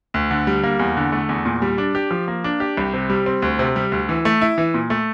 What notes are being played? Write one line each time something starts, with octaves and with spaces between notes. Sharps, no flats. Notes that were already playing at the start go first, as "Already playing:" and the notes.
D2
D3
G3
A#3
E2
D3
A3
E2
A#2
G3
D4
G4
F3
A#3
D4
G4
C2
C3
G3
C4
D2
C3
G3
D2
E3
A3
E4
E3
A#2
A3